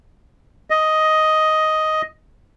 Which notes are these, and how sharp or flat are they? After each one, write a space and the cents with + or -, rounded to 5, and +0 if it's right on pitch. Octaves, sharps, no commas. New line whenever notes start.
D#5 +5